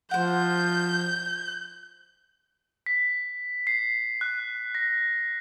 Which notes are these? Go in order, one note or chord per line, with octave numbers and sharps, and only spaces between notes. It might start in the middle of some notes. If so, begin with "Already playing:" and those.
F3 C5 F#5 G6
B6
C7
F#6
A#6